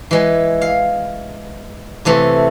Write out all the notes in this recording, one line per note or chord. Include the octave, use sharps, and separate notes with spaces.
E3 G#3
F5
C3 E3 A3